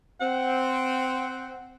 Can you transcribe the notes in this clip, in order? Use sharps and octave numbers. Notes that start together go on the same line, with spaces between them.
C4 F#5